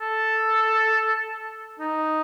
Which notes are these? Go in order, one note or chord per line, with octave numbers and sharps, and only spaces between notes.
A4
D#4